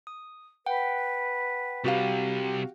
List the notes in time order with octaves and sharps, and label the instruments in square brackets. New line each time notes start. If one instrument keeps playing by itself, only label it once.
[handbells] D#6
[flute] B4 [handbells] F#5 G5
[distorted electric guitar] C3 G3 [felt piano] F#4 G4 F5